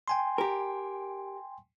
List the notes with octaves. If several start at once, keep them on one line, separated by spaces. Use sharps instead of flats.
G5 G#5 C6
G4 A#4